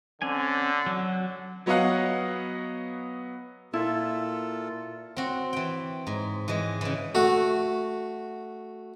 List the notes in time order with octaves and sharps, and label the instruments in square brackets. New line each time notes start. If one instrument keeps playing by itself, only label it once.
[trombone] D3 [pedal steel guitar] C4 C#4 G#5
[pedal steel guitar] F#3 F#4
[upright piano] F#3 B3 C#5 D#5 F5 F#5
[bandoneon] A#2 F4 A4 [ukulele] E4
[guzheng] C4 F#4
E3 G5
G#2
E3 G#3
C#3 E3
[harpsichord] A3 F#4